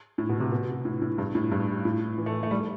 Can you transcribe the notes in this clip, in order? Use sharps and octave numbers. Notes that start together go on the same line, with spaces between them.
A2
B2
C3
B2
A2
A2
G2
A2
G2
A2
E3
A3
A3
G3